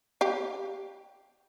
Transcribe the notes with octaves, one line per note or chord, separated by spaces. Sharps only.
G4 F5